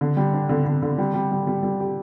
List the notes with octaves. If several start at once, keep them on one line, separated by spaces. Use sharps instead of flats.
D3
G3
D4
D3
D3
D3
G3
G3
G3
G3
G3
G4